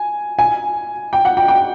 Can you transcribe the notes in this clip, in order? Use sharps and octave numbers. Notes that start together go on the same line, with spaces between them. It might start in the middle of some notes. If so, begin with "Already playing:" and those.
Already playing: G#5
G#5
G5
F#5
G5
G5